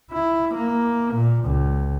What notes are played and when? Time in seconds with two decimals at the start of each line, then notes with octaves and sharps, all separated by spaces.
0.12 E4
0.55 A#3
1.14 A#2
1.45 C#2